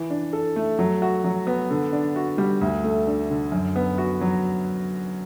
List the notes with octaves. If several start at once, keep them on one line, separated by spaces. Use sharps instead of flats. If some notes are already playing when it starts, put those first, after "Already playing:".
Already playing: E3
D4
A4
A3
F#3
F#4
F#3
B3
D3
D4
F#4
G3
D2
A3
D4
D3
F#2
B3
F#4
F#3